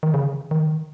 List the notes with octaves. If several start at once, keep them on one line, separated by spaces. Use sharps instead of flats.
D#3
C#3
D#3